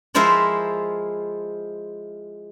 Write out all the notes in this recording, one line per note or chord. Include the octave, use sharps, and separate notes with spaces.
F3 G#3 E4 A#4 C5 E5